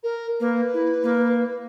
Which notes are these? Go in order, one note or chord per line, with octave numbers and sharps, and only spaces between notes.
A#4
A#3 B4
E4
A#3